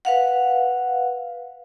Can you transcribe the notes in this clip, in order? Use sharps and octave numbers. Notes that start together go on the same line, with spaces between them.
B4 F5 F#5